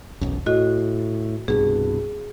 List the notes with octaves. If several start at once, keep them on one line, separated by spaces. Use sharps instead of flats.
E1 B1 F#2
A2 F#4 D#5
C2 G2 B2 G#4